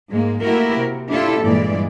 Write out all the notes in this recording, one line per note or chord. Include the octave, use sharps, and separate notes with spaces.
G#2 G#3 A#3
A3 A#3 E4 F#4 G4 A#4
C3
D4 E4 F4 G4 A4
G2 A#2 E3 G#3 D5